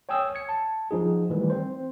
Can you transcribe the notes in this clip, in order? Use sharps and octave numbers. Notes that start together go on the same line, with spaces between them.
C#5 G5 G#5 D#6 E6
G#6 C#7
A5
F3 D#4 G#4
D#3 E3 G3 A3
C4 C5